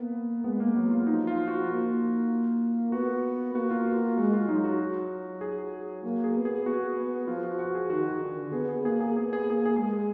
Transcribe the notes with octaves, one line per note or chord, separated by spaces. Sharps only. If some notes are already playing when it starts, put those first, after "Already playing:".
Already playing: A#3 B3
G#3 B3
A#3
F#3 B3
F4
F3 D#4
F4
F#4
A#3 F4
B3 F#4
A#3 F#4
F4
F#4
G#3 F#4
F4
F#3 D#4
F#4
G#4
A#3 F#4
G#4
B3
G#4
B3 F#4
B3
F3 F4
F#4
F#4
G#4
D#3 F#4
D3
B3 G#4
G#4
A#3 G#4
G#4
B3 G#4
G#4
A#3 G#4
G#4
G#3 G#4